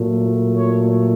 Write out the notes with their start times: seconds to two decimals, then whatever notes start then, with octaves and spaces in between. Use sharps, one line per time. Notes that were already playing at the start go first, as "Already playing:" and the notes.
Already playing: A#2 F#3 A3
0.55 C#5